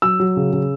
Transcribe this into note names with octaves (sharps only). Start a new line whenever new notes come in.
F#3 E6
F#3
C#3
C#3